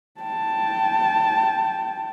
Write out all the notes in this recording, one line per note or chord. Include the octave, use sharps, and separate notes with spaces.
G5 A5